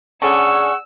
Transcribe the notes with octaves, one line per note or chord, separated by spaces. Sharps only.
D3 C#4 G#4 F#5 C#6 E6